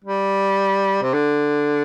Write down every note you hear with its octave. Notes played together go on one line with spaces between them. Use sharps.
G3
C3
D3